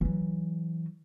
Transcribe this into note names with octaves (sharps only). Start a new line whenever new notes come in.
E3 F#3